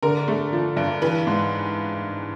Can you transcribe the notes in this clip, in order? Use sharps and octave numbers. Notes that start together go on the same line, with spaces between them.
D3 A#4
A3
F3
G2
E3 B4
G#2